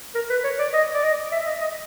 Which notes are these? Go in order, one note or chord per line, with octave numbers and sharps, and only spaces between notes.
A#4
B4
C#5
D5
D#5
D5
D#5
E5
D#5
D#5